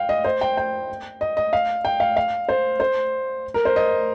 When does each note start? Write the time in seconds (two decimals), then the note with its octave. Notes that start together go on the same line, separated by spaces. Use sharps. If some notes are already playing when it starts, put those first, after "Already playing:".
Already playing: F5 G5
0.09 D#5
0.25 C5
0.41 G5
0.57 G5
1.21 D#5
1.37 D#5
1.53 F5
1.85 G5
2.00 F5
2.17 F5
2.49 C5
2.80 C5
3.54 A#4
3.65 C5
3.76 D#5